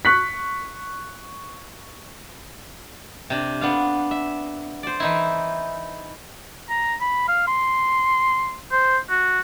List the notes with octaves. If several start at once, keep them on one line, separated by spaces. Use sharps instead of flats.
C#6 F#6 B6
C3 D4
B3 D4 F5
E5
C5 D5
E3 D#4 E4
A#5
B5
F5
C6
C5
F#4